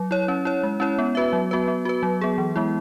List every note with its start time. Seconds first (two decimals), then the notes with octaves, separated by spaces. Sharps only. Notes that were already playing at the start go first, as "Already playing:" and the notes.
Already playing: F#3
0.11 E4 C#5
0.28 C#4
0.45 E4 C#5
0.63 G#3
0.80 C#4 E4 C#5
0.99 B3
1.15 F#4 B4 E5
1.33 F#3
1.51 B3 F#4 B4
1.68 B3
1.85 F#4 B4
2.03 F#3
2.21 B3 G#4
2.38 E3
2.56 G#3 B3 E4